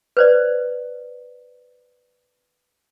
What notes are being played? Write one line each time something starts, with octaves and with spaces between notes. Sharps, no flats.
B4 C5 D5